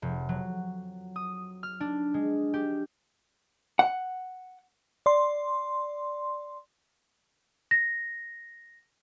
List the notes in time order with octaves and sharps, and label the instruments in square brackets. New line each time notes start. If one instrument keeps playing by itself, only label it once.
[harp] F1
F#3
D#6
F6
D4
G#3
G4
[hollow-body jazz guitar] F#5
[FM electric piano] D5 C6
[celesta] A#6